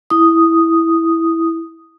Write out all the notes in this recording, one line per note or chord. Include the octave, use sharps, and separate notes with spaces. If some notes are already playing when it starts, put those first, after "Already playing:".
E4 D#6